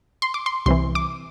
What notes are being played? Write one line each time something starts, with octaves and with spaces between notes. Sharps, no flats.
C6
D6
C6
C2 C3 E3 C6
D6